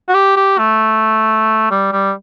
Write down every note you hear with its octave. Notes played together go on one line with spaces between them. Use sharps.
F#4
G4
G4
A3
G3
G3